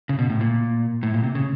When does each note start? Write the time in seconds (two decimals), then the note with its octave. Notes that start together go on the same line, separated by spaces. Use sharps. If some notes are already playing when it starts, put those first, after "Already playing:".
0.09 C#3
0.19 B2
0.30 A2
0.41 A#2
1.03 A2
1.14 A#2
1.24 C3
1.35 C#3